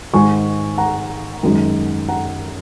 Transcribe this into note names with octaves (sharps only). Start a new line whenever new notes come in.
G#2 D#3 G#3 G#5 C#6
F#5 A#5
F#2 D#3 G#3
F#5 A#5